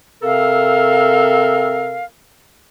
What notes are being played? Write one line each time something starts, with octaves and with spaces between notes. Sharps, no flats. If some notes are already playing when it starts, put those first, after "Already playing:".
C3 C4 A4 A#4 F5